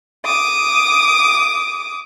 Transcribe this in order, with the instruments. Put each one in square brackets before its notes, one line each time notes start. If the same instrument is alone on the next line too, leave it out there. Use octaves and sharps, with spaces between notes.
[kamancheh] D6 D#6